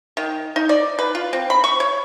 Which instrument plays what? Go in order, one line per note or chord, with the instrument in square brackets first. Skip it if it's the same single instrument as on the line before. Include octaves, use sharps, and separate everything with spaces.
[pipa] D#3
D#4
D5
B4
F4
C4
B5
C#6
C#5